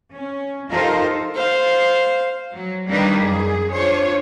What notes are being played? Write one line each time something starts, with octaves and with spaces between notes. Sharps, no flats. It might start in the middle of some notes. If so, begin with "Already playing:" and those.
C#4
D#4 F4 G4 A4 A#4 C5
C5 F5
F#3
D#3 G3 A#3 D4 D#4 B4
F#2 G#4
D4 F4 C5 C#5